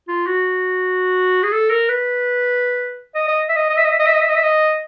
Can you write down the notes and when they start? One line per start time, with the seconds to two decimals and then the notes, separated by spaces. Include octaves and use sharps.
0.08 F4
0.27 F#4
1.43 G#4
1.52 A4
1.70 A#4
1.89 B4
3.15 D#5
3.28 D#5
3.49 E5
3.56 D#5
3.70 D#5
3.77 E5
3.84 D#5
3.92 E5
3.99 D#5
4.06 E5
4.14 D#5
4.21 E5
4.29 D#5
4.36 E5
4.43 D#5